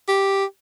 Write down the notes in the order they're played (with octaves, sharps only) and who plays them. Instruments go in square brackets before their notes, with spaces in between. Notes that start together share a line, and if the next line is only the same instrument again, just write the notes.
[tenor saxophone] G4